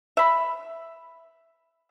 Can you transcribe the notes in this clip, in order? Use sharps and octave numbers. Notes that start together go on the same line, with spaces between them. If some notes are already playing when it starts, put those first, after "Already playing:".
E5 B5